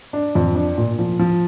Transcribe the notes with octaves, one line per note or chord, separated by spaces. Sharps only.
D4
F2
D4
A#2
F3
F3